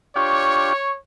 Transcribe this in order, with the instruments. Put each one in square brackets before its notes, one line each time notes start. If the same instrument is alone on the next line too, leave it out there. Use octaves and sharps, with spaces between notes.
[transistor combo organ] D4 F4 G4 [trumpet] C#5 [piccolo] C#6